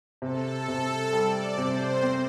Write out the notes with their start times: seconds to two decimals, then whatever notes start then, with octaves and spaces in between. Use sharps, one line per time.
0.22 C3 A4
0.68 C3
1.13 G3 D5
1.57 C3 C5
2.03 C4